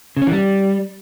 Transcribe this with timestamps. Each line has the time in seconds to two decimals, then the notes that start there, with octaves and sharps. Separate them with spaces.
0.17 C#3
0.22 C#4
0.27 E3
0.32 G3